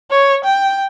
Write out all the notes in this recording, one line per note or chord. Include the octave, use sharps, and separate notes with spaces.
C#5
G5